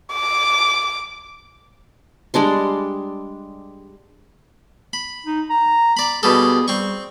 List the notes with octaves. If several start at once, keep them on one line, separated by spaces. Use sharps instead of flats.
D6
G3 G#3 D4 C6
B5
D#4
A#5
D5 B5
B2 G3 G#4 A4
G3 C4 C#6